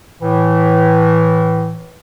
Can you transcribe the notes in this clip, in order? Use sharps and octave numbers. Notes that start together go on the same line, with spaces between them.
A2 E3